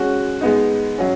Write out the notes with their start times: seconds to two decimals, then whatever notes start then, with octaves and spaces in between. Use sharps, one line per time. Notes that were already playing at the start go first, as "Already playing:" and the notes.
Already playing: G#3 C#4 F#4
0.41 G#3 B3 D#4
0.98 F#3 C#4